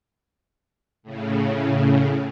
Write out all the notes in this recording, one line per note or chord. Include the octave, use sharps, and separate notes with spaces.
A2 C#3